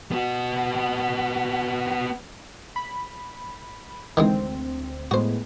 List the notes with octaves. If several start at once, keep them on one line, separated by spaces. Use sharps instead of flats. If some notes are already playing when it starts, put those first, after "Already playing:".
B3 F#4
B5
D2 D#3 E3 G#3 C4
A2 G#3 B3 F#4 C5